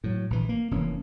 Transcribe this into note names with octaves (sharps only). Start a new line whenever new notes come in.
A2 F#3
A#1 E3
A#3
F1 E3 A#3 C#4